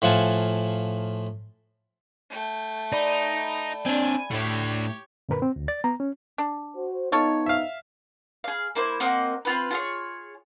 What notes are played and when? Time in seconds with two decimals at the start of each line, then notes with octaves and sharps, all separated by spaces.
0.02 A2 F3 F5 F#5 G#5 A5
2.30 A3 G5
2.93 D#4 D5 B5
3.86 C4 D4 G#5
4.31 A2 A3 D4 G4 C#5
5.29 F#2 A#2 D3 A#4 B4 B5
5.42 C4
5.56 D2
5.68 D5 A6
5.84 B3 A#5
6.00 C#4
6.38 D4
6.75 F#4 C5
7.12 B3 D#4 F4 A4 C#5
7.46 E5 F5
8.44 G#4 F5
8.75 A#3 E4 C5
9.00 A#3 C4 F#4 D#5
9.45 C4 F4 B4
9.71 F4 G#4 C#5